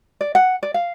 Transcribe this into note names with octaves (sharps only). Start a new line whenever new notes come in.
D5
F#5
D5
F5